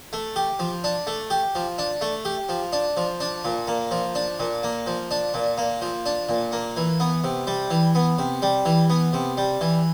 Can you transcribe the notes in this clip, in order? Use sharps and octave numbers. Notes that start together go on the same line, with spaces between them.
A3
G4
F3
D4
A3
G4
F3
D4
A3
G4
F3
D4
F3
D4
A#2
A#3
F3
D4
A#2
A#3
F3
D4
A#2
A#3
F3
D4
A#2
A#3
E3
B3
C3
G3
E3
B3
C3
G3
E3
B3
C3
G3
E3